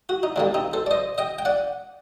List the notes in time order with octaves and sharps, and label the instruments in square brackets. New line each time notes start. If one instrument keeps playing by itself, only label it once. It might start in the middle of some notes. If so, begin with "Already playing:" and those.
[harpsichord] F#4
D#4
D2 D3 G3 A#3 D4
C4 D#4
A4 C5
D5
C5 D#5
D#5 G5
G5
D5 F#5